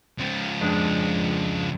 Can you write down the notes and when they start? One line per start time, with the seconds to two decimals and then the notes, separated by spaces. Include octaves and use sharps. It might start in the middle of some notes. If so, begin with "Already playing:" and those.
0.19 C#2 F3
0.61 F2 G#3 D4